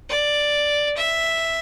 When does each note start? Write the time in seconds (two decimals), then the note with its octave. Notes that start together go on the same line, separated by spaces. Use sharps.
0.09 D5
0.97 E5